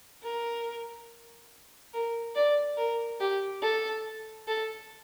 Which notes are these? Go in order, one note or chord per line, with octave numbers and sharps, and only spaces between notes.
A#4
A#4
D5
A#4
G4
A4
A4